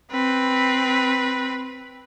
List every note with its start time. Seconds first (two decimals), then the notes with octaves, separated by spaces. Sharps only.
0.11 C4 B4